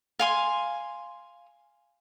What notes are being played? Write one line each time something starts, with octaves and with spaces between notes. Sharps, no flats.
F5 G#5 C6